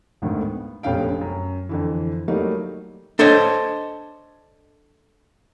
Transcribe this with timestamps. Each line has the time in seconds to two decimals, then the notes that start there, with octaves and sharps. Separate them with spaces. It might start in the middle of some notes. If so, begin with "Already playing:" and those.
0.22 G#1 D2 A2 D#3
0.41 B3
0.83 F1 A#1 B3 C#4 F5 G5
1.21 F#2
1.69 F2 D3 E3
2.28 F#3 G3 A3 A#3 D#4
3.19 D4 A4 C5 C#5 D#5